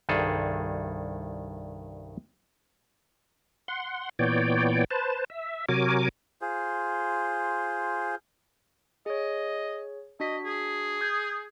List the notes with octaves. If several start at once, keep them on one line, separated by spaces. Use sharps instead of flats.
C2 G2 D#3 G#4 A4
F#5 C6
A#2 E3 B3 C#5 D5 G5
B4 C5 A5
E5
C3 F#3 F#4 A#4 G#5 D6
F4 G#4 C5
G#4 C#5 D#5
D4 F#4 D#5 B6
G#4
D#6 G6 G#6